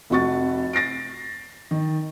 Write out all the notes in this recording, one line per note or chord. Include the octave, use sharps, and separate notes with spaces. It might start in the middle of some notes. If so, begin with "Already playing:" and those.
F1 F2 F#4 C#6 A6
A6 A#6 C7 D7
D#3